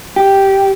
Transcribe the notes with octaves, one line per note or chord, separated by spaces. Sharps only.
G4